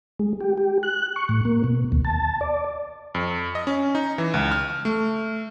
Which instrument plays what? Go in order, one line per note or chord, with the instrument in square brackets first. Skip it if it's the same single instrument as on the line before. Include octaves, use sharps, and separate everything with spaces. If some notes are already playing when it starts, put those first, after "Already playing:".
[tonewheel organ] G#3
G4
G4
F#6
C#6
A2
A#3
B2
D#2
A5
D5
[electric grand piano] F2
D#5
C#4
D#4
E3
C#2
F6
A3